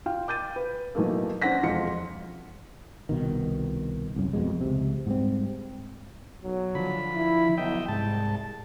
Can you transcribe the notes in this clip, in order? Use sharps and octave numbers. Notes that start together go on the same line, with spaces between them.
F4 F5 G5
D6 G6 A6 D#7
B4
B1 B2 E3 A3 A#3
C#4 D4 C5 F#5 A#6 B6
E1 F2 F4 C#7
C2 B2 D#3
C2 F#2
F2 B2 G#3
C#2 C3
G#2 G3 C4
B1 F#3
D3 F3 B5
E4
B1 D#5 E5 G5
C2 G#2 A5